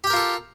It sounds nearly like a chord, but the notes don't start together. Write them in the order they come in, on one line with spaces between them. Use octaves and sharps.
G4 G5 A#4 F4 A4